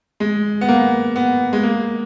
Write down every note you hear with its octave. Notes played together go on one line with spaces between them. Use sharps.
G#3
B3
A#3
B3
G#3
A#3